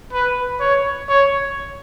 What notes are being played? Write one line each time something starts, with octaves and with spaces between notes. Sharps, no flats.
B4
C#5
C#5